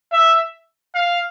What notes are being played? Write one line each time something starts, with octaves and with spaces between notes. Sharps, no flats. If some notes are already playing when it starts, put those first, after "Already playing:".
E5
F5